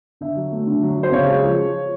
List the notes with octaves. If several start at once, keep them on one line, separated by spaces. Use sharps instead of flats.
D3 E5
F#3
A3
D3
F#3
F#3
C5
C#3 C#5
G#3
F3